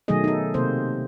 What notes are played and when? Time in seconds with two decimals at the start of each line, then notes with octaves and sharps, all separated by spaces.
0.08 B2 D#3 F#3 A3 G#4 D#5
0.24 D#4 A4
0.54 C3 A#3 C4 C5